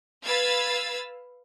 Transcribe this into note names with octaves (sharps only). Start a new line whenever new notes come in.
B4 F5 E6 G#6 A6